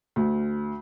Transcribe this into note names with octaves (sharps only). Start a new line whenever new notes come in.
D2